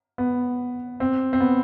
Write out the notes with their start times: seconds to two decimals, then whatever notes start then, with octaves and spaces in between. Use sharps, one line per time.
0.18 B3
1.00 C4
1.33 C4
1.40 B3